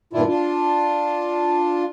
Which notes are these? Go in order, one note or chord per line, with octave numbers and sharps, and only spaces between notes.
G2 A#2 D#3 D4 E4 F4
D4 F4